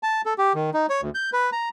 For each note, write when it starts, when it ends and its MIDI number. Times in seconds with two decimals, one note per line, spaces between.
0.03 0.21 81
0.26 0.33 69
0.38 0.53 67
0.55 0.70 51
0.74 0.86 63
0.90 1.01 73
1.02 1.10 38
1.15 1.30 91
1.33 1.50 71
1.52 1.69 82